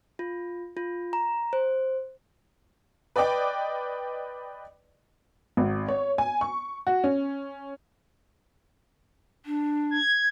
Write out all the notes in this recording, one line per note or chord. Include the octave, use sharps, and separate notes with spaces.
F4
F4
A#5
C5
B4 D5 D#5 G5 D6
G#1
C#5
G#5
C#6
F#4
C#4
D4
G#6